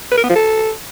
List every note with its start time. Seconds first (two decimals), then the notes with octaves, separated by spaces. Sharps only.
0.12 B4
0.18 A#4
0.24 B3
0.30 F3
0.35 A4